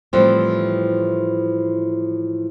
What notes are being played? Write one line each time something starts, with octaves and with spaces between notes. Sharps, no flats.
A2 E3 F3 G3 C4